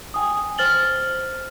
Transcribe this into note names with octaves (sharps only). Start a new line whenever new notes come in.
G5 G#5 D#6
C5 F6 A6 F#7 G7